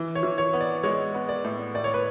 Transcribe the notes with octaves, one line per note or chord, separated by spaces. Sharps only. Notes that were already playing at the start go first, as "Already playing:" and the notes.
Already playing: E3
C#5
E3
C#5
B3
D5
G#3 C#5
B3
D5
A2
A2 D5
C#5
B4